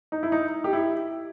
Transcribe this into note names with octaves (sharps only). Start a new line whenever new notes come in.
D#4
E4
D#4
G4
E4